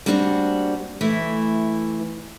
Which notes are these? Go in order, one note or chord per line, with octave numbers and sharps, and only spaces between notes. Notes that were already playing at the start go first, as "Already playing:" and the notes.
G3 A#3 C4 D4 F4 F#4
E3 A3 E4